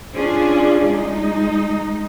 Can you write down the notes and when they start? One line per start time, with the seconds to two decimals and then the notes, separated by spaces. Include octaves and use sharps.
0.15 C#4 D4 F4 G#4
0.87 G#3 D#4